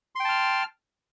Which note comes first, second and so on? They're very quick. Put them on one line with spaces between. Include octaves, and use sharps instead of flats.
C6 G5 A5 F6